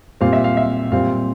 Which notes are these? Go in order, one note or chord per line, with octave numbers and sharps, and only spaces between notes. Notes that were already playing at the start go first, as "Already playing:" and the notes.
A#2 G3 C4 F5
E5
F5
E5
A#2 G3 C4 F5